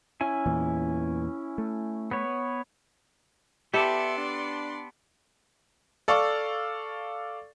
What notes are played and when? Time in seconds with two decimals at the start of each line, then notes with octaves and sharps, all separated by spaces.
0.21 C#4 E4 G#5
0.46 E2 A#2 E3
1.58 A3
2.11 B3 B4 C#5
3.74 B3 G4 A4 D5 E5 C6
4.17 D4
6.08 A4 D5 F5 C#6